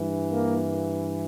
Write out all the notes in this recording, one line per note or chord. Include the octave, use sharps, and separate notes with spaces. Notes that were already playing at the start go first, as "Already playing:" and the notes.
Already playing: G2 E3
A#3